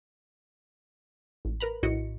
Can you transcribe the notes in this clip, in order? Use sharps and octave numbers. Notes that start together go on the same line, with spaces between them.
A1
A#4 B4 A#5 B5
A#1 A2 E4 F#4 D#5 C#7